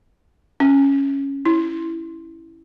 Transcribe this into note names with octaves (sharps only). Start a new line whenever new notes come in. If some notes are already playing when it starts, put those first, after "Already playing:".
C#4
E4